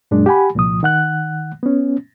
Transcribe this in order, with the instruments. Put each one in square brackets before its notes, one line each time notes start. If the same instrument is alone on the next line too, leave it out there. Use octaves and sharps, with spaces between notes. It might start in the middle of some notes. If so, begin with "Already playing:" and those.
[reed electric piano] F#2 A#2 G#3 D4
G4 F#5 G#5 B5
C2 A#2 F3 D#6
D#3 F#5 F#6
B3 C#4